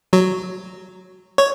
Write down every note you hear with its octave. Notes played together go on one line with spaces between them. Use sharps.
F#3
C#5